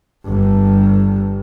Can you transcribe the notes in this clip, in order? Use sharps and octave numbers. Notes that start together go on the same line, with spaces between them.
G1 G2